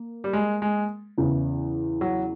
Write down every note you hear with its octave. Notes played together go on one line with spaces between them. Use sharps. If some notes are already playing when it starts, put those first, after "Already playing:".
Already playing: A#3
G3
G#3
G#3
E2 C#3 E3
F#3